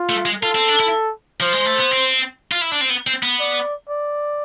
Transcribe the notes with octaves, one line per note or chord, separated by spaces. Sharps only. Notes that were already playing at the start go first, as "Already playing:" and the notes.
Already playing: F4
A3
G#3
F4 A4
C4
D4
E4
F3 C5
G#3
A3
B3
C4
F4
E4
D4
C4
B3
C4
B3
D5
D5